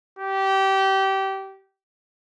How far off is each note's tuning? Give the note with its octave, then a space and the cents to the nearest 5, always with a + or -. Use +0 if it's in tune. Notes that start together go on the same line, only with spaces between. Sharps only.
G4 -20